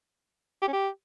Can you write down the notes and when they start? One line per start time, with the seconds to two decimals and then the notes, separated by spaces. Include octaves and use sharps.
0.62 G4
0.68 C#4
0.73 G4